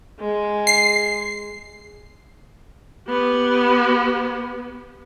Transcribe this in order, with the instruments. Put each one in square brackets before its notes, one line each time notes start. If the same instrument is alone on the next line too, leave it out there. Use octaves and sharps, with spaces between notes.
[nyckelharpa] G#3
[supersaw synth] C7
[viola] B3 G4